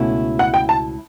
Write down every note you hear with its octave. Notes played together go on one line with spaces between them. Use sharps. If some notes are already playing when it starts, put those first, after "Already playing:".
Already playing: C#2 B2 A3 C#4 E4
F#5
G5
A5